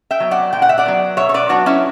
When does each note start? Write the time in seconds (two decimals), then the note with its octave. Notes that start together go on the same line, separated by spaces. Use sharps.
0.11 E5 G5
0.20 F#3 B3
0.31 D5 F#5
0.53 A#2 G5
0.62 F#5
0.69 E5
0.78 D5 F#5
0.86 F#3 B3
1.17 B2 C#5 E5
1.29 C#5
1.34 B4 D5
1.49 F#3 B3 D4 F#4
1.66 C#4 E4